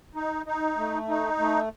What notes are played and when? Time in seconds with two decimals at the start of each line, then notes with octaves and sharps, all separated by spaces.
0.15 D#4
0.46 D#4
0.77 A3
1.08 D#4
1.39 A3